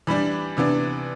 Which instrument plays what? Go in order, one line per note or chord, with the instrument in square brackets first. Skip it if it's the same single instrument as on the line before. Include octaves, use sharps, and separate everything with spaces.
[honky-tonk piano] E3 G3 D4 B5
C3 E3 B3 D4